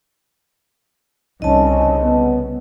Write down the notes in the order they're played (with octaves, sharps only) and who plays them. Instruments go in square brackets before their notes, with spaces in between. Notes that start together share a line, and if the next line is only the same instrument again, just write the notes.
[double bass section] C2 C#3 [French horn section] C#4 D#4 [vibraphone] D#5 A5
[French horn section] B3